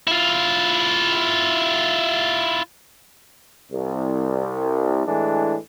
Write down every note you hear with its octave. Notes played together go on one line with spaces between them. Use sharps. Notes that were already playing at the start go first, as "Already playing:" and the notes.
E4 F4
C2
A2 E3 G#3 D4